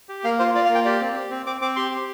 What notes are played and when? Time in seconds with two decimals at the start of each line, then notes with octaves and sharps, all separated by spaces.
0.09 G4
0.24 A#3 F5
0.39 F4 C5
0.54 F4 D5
0.65 F5
0.69 A#3
0.75 G5
0.85 G4 D5
1.01 C4
1.15 G4
1.31 C4
1.46 C4 D6
1.61 C4 D6
1.76 G4 C6
1.91 G4